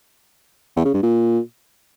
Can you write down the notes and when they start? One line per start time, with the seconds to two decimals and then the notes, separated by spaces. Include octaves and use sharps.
0.76 E2
0.85 C#3
0.94 G2
1.03 A#2